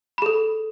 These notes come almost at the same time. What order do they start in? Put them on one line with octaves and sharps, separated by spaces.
B5 G#4 A4